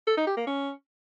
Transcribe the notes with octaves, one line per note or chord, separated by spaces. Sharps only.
A4
D#4
G4
A#3
C#4